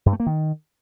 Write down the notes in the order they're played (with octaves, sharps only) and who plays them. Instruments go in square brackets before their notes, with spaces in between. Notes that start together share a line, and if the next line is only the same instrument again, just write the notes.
[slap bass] G2
A3
A#3
D#3